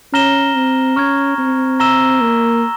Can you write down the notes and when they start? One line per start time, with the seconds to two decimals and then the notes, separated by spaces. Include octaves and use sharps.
0.13 C#4 A#5 F6 A#6 E7 G7
0.55 C4
0.96 C#4 C#6 F6 G#6
1.38 C4
1.80 A#5 E6 A#6 E7 G7
2.21 A#3